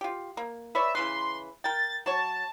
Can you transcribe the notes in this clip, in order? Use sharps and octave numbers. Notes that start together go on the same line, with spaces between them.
F4 G4
A#3
B4 C#5 D5 E5
C#3 E3 B4 C6
A#4 G5 A6
F#3 C#5 A5